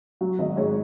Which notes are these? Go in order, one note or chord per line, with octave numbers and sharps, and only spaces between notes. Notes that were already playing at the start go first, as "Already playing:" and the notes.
F#3 F#4
G#1 D#5
G#2 C#5